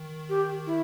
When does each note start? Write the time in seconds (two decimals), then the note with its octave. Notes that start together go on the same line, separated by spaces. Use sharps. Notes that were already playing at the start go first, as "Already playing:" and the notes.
Already playing: D#3
0.29 G4
0.67 E4